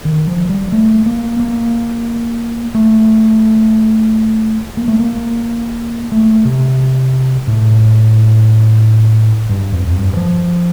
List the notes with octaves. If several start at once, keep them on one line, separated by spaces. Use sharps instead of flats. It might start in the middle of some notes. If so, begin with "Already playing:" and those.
D#3
F3
G3
A3
A#3
A#3
A3
A#3
A3
A#3
A3
C3
A2
G2
F2
F2
G2
F3